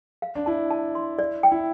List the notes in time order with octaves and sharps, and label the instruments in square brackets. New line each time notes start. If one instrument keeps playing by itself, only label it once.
[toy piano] F5
[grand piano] D4
[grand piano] E4 [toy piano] A5
[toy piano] A5
C6
D5
G5
[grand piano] E4